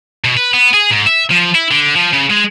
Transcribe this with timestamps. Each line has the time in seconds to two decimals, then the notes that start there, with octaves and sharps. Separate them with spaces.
0.24 B2
0.37 B4
0.54 B3
0.74 G#4
0.91 G#2
1.07 E5
1.31 F3
1.55 E4
1.71 D3
1.96 F3
2.13 C#3
2.30 G#3